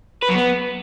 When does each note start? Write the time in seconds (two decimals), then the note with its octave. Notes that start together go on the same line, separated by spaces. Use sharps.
0.23 B4
0.29 F#3
0.35 B3